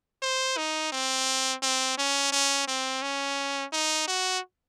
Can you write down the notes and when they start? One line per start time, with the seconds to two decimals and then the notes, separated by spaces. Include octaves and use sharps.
0.23 C5
0.57 D#4
0.93 C4
1.63 C4
1.98 C#4
2.32 C#4
2.68 C4
3.02 C#4
3.73 D#4
4.08 F#4